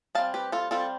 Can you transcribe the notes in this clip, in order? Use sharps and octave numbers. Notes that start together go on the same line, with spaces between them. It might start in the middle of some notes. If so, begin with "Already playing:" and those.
G3 C4 F5 A5
G4 B4
F4 A4
G3 C4 F4 A4